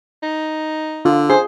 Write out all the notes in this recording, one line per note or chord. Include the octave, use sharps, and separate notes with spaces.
D#4
D3 F4
G#4 C5